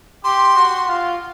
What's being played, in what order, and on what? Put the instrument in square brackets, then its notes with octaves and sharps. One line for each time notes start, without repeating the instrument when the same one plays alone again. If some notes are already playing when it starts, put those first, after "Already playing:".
[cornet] G4 [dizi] C6
[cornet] F#4
F4